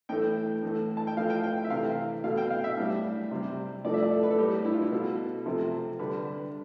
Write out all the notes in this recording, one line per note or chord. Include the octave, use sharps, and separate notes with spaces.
A2 E3 A3 G5
A2 E3 A3
A5
G5
A2 F3 A3 F5
G5
G5
G5
E5
C3 E3 A3 F5
B2 A3 F5
G5
F5
E5
A2 G3
C3 G3
A2 F3 A3 D5
E5
D5
A4
B4
A4
A2 G3 G4
E4
F4
E4
B2 A3 A4
C3 F3 A3
D3 G3 B4